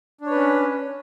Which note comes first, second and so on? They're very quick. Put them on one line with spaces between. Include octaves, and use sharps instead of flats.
D4 C#5 B4 C#4